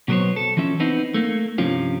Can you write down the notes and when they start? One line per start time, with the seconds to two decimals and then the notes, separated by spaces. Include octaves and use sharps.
0.08 B2 F#3 B3 A#4 C5 C#5
0.36 A4
0.57 E3 F3 C#4 E5
0.80 B3 C4 D#4 E4
1.14 A3 A#3
1.58 G2 C3 F3 C#4 F4